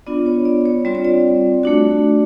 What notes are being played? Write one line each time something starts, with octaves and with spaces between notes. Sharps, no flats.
B3 D4 F4 D5
C#5
D5
C#5
G3 C4 F4 D5
C#5
D5
A3 D4 F#4